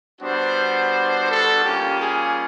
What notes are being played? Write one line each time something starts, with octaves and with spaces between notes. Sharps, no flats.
G3 B3 D4 F#4 C5
A4
G3 A#3 C#4 F4 G4
G#4